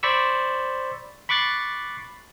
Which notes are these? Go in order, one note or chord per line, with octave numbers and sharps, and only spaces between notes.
C5 D5 B5 C#6 E6
B5 C#6 D6 F#6 A6 C7